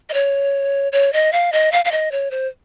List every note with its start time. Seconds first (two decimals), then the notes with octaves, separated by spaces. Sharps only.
0.09 D#5
0.14 C#5
0.92 C#5
1.13 D#5
1.33 F5
1.52 D#5
1.72 F5
1.85 F5
1.92 D#5
2.12 C#5
2.31 C5